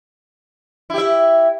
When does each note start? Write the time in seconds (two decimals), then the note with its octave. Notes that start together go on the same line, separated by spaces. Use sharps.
0.90 E4
0.94 G4
0.98 E5